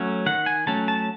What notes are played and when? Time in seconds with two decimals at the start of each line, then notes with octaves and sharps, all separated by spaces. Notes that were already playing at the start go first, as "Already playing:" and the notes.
Already playing: F#3 A3 C#4
0.26 D#3 F#5
0.46 G#5
0.67 F#3 A3 C#4 A5
0.88 A5